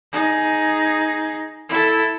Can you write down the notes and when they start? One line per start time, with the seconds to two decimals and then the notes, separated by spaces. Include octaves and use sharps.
0.12 D#4 G#4
1.69 E4 A4